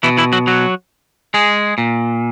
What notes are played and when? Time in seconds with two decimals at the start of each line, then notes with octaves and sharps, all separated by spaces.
0.03 B2 E3 E4
0.17 E3 E4
0.33 F#3 F#4
0.47 F#3 F#4
1.34 G#3 G#4
1.78 A#2